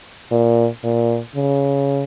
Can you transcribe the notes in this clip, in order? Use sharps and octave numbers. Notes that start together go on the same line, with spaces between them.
A#2
A#2
C#3